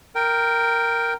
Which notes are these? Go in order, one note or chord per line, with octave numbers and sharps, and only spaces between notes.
A#4 G5